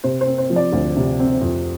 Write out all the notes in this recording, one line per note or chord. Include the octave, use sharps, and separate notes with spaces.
C3 C5
C5
C4
C5
F3
D5
D2
C3
C4
F2